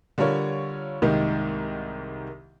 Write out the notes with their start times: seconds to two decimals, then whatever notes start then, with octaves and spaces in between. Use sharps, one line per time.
0.18 D3 G3 F4 A#4 C#5
1.02 C2 G#2 D#3 A#3 D#4 G4